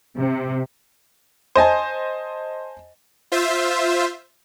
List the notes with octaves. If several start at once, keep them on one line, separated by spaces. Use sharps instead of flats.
C3
C5 D#5 G#5 A5
F4 C5 E5